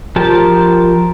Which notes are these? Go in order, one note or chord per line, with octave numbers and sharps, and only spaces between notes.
F3 G4 A#4 A5